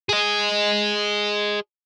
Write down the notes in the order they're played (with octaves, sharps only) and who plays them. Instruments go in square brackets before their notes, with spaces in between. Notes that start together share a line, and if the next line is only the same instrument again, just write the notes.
[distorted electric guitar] G#4 D#5